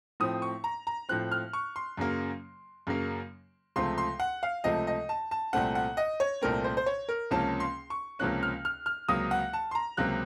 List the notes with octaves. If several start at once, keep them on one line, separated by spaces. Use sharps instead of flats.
A2 F3 C4 D#6
C#6
A#5
A#5
A2 F3 C4 F#6
F6
C#6
C6
F#2 C#3 F#3 A#3
F#2 C#3 F#3 A#3
C#2 C3 F3 A3 C6
C6
F#5
F5
C#2 C3 F3 A3 D#5
D#5
A5
A5
C2 A#2 A3 C4 F#5
F#5
D#5
C#5
C2 A#2 A3 C4 A#4
C5
C5
C#5
A#4
C#2 C3 F3 A#3 C#4 A5
C6
C#6
C#2 C3 F3 A#3 C#4 F#6
F6
F6
F6
C#2 C3 F#3 A#3 D#6
F#5
A5
C6
A#5
C#2 C3 F#3 A#3 F#6